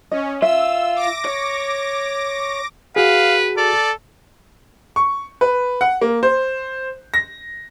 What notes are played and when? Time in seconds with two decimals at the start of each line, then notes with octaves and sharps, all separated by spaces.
0.11 C#4 D#5
0.42 F4 E5 E6
0.96 D6 A#6
1.25 C#5
2.96 F#4 G#4 B4 F5
3.58 A4 D5
4.96 C#6
5.41 B4
5.81 F#5
6.01 A#3
6.23 C5
7.14 A#6